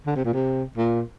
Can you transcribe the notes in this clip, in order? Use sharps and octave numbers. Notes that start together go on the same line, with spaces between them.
D3
C3
A#2
C3
A#2